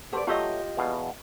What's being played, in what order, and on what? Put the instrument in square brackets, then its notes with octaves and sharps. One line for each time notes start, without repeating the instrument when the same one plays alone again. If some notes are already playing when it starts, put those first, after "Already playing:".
[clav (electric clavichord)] F#4 A4 C5 [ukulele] G4 B4 D5
[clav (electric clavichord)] F#3 A3 [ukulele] F4 G4 D#5
[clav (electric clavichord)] E2 B2 F5